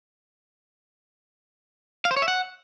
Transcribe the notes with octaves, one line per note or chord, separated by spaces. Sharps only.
F5
C5
C#5
E5
F#5